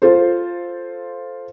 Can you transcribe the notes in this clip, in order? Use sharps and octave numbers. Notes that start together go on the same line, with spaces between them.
F4 A4 C5